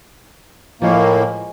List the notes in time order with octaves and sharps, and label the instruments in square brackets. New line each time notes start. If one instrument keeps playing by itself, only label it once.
[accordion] A2 A#3 [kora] F3 G#3 C#5